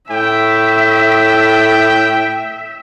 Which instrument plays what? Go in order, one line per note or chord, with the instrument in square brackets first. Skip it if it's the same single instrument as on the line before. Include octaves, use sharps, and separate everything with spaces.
[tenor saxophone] A2 [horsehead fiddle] E5 [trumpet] G5